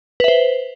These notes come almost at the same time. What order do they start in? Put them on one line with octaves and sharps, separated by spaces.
B4 E5 C5